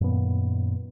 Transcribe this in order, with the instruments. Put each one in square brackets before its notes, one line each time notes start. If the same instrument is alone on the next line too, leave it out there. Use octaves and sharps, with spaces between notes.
[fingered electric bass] F#2 A#2 D#3 B3